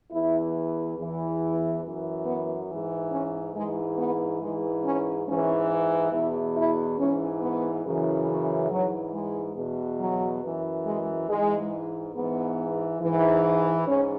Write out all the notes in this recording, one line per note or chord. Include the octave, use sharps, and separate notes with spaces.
E2 E3 E4
E2 E3
F#2 E3
B3
G#2 E3
C#4
G#2 E3 G#3
B3
G#2 E3 G#3
C#4
G#2 E3 C#4
E2 B2 E4
E4
G#2 E3 C#4
B3
F#2 C#3 E3
C#4
G#2 E3 F#3
G#3
E2 B2
F#3
F#2 E3
G#3
G#2 E3 G#3
G#2 E3 B3
G#2 E3
G#2 C#4